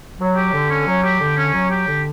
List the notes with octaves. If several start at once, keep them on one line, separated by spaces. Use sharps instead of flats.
F#3
G4
D3
C#4
F#3
G4
D3
C#4
F#3
G4
D3